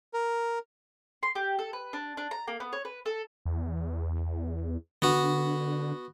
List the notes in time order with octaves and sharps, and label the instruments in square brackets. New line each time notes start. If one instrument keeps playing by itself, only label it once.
[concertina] A#4
[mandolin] C6
G4
A4
B4
D4
D4
A#5
A#3
B3
C#5
B4
A4
[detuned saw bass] E2
[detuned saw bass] D3 [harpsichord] B3 F#4